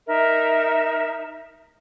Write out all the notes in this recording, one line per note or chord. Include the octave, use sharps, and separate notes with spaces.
D#4 A#4 E5